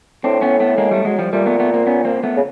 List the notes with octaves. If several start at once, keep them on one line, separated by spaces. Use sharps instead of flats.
A2 C4 D4
B3 C#4
A3 B3
G#3 A#3
G3 A3
F#3 G#3
F3 G3
A#2 G3 A3
A3 B3
A3 B3
A#3 C4
B3 C#4
A#3 C4
A3 B3
C#3